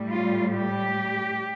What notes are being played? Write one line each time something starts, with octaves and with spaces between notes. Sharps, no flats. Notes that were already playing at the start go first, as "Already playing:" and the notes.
Already playing: A2 G3
F4
G4